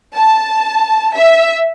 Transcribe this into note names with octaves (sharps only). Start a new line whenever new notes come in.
A5
E5